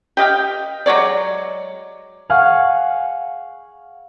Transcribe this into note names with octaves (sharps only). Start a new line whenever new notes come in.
G4 D#5 F5 G5
F#3 G#3 C#5 D5
G#4 F5 F#5 C#6